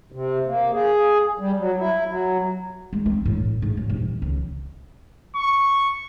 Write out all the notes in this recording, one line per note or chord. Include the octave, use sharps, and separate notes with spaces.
C3
A#3
G#4
G3
F#3
E4
F#3
G#3
C4
A2
G#2
F#2
D#1
C#2
C#6